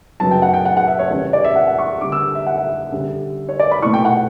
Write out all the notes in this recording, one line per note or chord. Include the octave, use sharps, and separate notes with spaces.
F#2 C#3 F#3 B3 A5
G5
F#5
G5
F#5
F#5
E5
C#5
E2 C#3 G3 C#4 C#5
D5
E5
F#5
F#5
C#6
D3 G3 D4 D6
E6
E5
F#5
E5
D3 G3 C#4
C#5
D5
B5
B2 A3 E4 C#6
G5
F#5